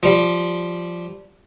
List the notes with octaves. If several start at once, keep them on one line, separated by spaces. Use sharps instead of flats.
F3 G3